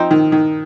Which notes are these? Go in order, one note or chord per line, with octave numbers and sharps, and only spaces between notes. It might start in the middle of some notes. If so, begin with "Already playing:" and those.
Already playing: F3 C4 D#4
D#3
D#3